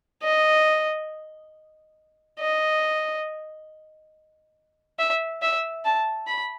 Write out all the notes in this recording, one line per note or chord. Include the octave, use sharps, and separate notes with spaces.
D#5
D#5
E5
E5
A5
B5